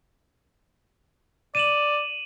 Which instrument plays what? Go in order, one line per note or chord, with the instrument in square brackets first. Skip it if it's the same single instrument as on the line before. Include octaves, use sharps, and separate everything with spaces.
[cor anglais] D5 [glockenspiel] D#7 E7 F#7